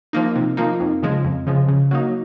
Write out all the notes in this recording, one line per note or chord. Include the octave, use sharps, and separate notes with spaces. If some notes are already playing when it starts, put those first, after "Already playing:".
F3 A#3 D#4
C3
F3 A#3 D#4
F2
C#3 F3 G#3
F2
C#3 F3 G#3
C#3
F#3 A#3 D#4